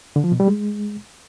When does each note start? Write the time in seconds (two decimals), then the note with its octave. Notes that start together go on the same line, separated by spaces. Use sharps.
0.16 D3
0.24 F3
0.32 B2
0.40 G3
0.48 G#3